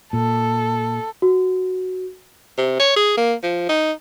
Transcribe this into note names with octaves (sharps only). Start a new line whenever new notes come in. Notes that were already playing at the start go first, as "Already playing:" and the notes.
A#2 A4
F#4
C3
C#5
G#4
A#3
F3
D#4